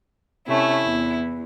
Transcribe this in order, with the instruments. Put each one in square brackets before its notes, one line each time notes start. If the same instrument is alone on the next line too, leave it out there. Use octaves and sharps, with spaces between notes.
[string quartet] C3 A3 C#4 [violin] E4
[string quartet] E2